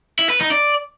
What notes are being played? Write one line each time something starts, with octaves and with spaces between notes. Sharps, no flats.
E4
B4
D#4
D5